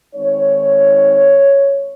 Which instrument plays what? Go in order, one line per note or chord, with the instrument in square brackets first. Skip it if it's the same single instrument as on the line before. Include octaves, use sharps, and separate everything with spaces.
[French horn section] D#3 G#3 C4 D#4 C#5